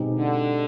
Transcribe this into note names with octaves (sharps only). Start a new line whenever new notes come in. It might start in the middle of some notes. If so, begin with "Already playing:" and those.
Already playing: B2 G#3 C4 D#4 G4
D3